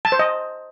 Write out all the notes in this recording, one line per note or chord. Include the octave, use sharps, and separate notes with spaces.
A5
C5
D#5